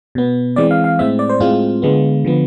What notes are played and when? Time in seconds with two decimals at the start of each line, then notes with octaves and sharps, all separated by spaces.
0.15 B2 B3
0.56 E3 G#3 C4 D5
0.71 F5
0.84 F5
0.99 A2 G#3 C4 E5
1.19 D5
1.29 C5
1.40 A2 G#3 C4 F4
1.82 D3 G#3 B3
2.25 D3 F3 B3